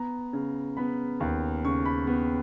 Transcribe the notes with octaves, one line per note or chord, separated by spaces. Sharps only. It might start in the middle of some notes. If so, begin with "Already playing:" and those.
Already playing: B3 A#5
C#3
B3 B5
D#2
C#3 C#6
B5
B3